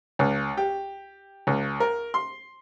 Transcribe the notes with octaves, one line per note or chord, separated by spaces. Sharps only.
C#2
G4
C#2
A#4
C6